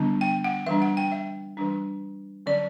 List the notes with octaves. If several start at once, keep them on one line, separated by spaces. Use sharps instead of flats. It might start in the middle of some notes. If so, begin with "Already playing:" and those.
Already playing: D3 G3 B3 D4
G5
F#5
E3 G3 D4 E5
F#5
G5
E5
E3 G3 D4
D3 F#3 C#4 D5